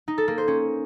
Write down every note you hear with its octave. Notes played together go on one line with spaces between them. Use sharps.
D#4
A4
A#3
C5
C#4